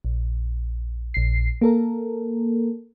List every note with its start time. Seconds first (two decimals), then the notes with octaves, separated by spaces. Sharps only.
0.05 A#1
1.14 A#1 C7
1.61 A#3 A4 A#4